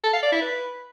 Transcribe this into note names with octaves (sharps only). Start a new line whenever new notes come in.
A4
F5
D5
E4
B4